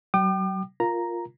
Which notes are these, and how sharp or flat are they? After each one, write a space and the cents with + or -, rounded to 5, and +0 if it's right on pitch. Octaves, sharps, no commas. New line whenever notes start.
F#3 +35 G5 -25 D6 +40
F4 +0 A#4 +0 A#5 +0